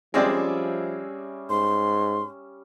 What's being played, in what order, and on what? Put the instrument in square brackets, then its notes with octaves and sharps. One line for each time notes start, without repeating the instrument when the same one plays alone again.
[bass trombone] F3 [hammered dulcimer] G3 C#4 E5 [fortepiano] G#3 C4 D5
[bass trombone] G#2 [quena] C6